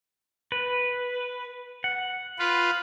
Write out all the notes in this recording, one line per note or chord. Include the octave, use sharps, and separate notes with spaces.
B4
F#5
F4 B4